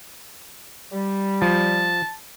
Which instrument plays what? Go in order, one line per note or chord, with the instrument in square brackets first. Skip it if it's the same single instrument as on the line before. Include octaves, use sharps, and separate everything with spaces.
[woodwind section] G3
[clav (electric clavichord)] F3 [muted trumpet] A5